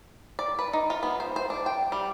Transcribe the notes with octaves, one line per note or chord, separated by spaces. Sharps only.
D5
B4
D#4
F4
B3
C5
C5
D4
G5
G3